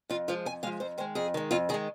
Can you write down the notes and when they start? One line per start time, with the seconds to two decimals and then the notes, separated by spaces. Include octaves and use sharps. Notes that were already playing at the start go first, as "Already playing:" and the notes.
0.10 F2 F4
0.28 F3 G#3 F4
0.46 F2 G#5
0.63 F3 G#3 F5
0.80 F2 C5
0.98 D#3 G#3 C5
1.15 F2 G#4
1.34 D#3 G#3
1.51 F2 F4
1.69 D#3 G#4
1.74 G#3